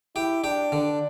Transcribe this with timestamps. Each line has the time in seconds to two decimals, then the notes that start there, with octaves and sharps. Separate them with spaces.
0.16 E4 G4
0.43 D4 G4
0.72 D3